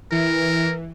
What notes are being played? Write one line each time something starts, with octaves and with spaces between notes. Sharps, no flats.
E3 A#4